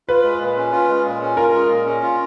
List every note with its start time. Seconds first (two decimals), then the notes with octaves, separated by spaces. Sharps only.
0.09 F4 B4
0.24 G#3
0.41 A#2
0.57 C#4
0.72 F4
0.88 G#3
1.05 A#2
1.22 C#4
1.37 F4 A#4
1.54 G#3
1.69 A#2
1.86 C#4
2.03 F4